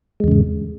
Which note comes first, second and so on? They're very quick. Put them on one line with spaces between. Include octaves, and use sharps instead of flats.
G#3 E2 C#3 G#2